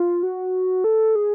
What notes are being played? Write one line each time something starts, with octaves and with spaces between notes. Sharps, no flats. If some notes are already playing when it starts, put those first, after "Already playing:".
Already playing: F4
F#4
A4
G#4